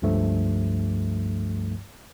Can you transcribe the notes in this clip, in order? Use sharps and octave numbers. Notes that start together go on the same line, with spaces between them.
C#2 G2 F3 A3